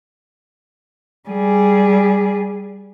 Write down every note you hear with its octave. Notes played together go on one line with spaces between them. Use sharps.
G3 G#4